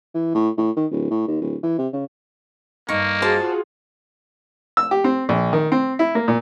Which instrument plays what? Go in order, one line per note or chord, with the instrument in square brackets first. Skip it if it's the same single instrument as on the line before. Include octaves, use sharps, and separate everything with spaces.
[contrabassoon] E3
A2
A2
D#3
D1
A2
D#2
D1
E3
C3
C#3
[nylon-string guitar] G2 D#4 D#5 [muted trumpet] A#3 [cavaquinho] C#6
[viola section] F4 F#4 G#4 [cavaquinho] C5 D5 A5
[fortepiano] E6
G4
C4
A#1
D#3
C4
E4
A#3
A#2